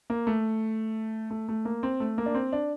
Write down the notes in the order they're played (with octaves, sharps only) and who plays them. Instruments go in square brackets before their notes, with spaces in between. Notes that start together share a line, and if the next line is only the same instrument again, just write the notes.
[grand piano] A#3
A3
A3
A3
A#3
C4
A3
A#3
D4
C4
D4